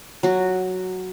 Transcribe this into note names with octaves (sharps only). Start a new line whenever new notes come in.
F#3 F#4